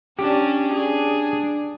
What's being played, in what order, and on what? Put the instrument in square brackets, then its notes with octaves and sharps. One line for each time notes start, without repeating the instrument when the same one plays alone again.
[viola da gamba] C#4 D4 [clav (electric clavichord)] G4
[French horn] D4 [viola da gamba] G#4